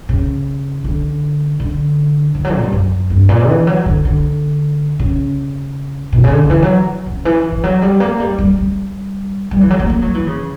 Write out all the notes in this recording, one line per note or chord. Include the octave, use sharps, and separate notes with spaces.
C#3
D3
D3
E3
F#3
A#2
G2
F#2
G2
A#2
E3
F#3
D3
D3
C#3
B2
C#3
D3
D3
E3
F#3
C#3
E3
E3
F#3
G3
A#3
G3
G3
G3
G3
E3
F#3
A#3
A#3
F#3
E3
C#3